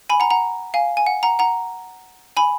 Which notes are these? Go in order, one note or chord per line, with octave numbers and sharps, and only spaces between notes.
G#5 B5
F#5 A#5
F#5 A#5
F5 G#5
G#5
F#5
F#5 A#5
F#5 A#5
G#5 B5